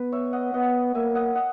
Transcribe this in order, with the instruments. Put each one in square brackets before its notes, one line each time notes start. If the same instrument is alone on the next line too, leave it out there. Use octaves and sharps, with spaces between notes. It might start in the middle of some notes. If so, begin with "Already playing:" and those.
Already playing: [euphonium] B3 [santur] B4
[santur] C#5 E5
D#5 F#5
[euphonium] B3 [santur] D#5 F#5
[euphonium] A#3 [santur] E5 G#5
[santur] D#5 F#5
D#5 F#5